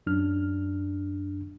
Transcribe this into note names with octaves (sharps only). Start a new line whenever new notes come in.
F#2 D4 F6